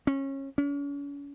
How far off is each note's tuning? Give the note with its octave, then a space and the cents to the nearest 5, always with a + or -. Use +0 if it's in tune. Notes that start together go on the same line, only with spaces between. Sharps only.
C#4 -25
C#4 +40